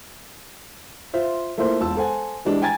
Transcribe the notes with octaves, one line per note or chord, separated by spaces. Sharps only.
F4 C5 E5
A3 A#3 E4 F4 C5
E1 F4 A5 E6
A4 C5 F#5 G#5
E3 G3 G#3 D4
G5 G#5 A#5 G#6 A6